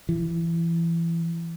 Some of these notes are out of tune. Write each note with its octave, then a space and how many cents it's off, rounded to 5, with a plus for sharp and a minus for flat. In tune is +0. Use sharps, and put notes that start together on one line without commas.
E3 +25